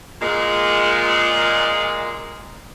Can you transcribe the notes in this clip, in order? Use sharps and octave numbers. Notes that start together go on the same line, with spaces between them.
A#2 G#3